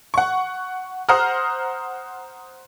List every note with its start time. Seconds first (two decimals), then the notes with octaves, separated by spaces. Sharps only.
0.14 F#5 C#6
1.09 C5 F#5 A#5 D#6 F6